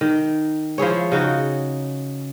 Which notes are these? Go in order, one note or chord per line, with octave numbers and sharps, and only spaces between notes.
D#3
F3 E4 G#4 C#5
C#3 D#4 F#4